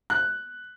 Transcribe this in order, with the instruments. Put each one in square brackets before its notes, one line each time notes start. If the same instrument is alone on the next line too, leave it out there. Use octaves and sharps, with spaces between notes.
[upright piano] F#6